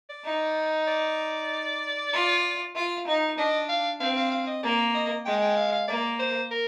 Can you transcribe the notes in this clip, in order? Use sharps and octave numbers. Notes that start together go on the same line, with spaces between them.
D5
D#4
D5
F4
F4
D#4
D4 D#5
F5
C4 F5
F5
F5
D#5
A#3 D5
D#5
G#3 G5
G5
F5
F5
A#3 D5
C5
A#4